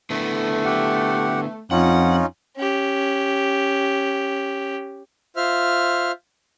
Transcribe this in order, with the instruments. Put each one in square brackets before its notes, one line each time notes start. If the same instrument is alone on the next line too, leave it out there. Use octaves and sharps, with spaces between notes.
[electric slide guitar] D3 B3 E4 [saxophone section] A3
[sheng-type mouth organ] G4 F#5
[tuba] F2 [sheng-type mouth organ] C#4 D#4 F4 [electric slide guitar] F#5
[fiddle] C#4 G4
[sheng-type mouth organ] F4 C5 E5 F6